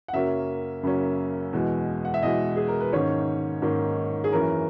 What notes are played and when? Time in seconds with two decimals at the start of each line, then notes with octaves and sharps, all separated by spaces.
0.08 F#5
0.13 F#2 C#3 F#3 A#3 C#4 E5
0.83 F#2 C#3 F#3 A#3 C#4
1.53 E2 B2 G#3
2.05 F#5
2.14 E5
2.23 E2 B2 G#3 D#5
2.56 G#4
2.68 A#4
2.81 B4
2.93 G#2 D#3 A#3 C#4 C#5
3.62 G#2 D#3 A#3 C#4
4.24 G#4
4.33 F#2 E3 A#3 C#4 A#4